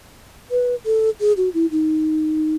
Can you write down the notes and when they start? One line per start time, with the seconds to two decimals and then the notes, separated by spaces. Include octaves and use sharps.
0.51 B4
0.86 A4
1.20 G#4
1.37 F#4
1.54 E4
1.71 D#4